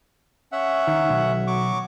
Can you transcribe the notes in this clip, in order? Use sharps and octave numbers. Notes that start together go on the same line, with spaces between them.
C#4 E5 F#5
D#3
B1
F#3 C#6 D6